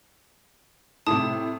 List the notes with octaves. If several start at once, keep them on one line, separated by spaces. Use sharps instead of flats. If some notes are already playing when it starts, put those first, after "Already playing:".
A2 C3 A5 D#6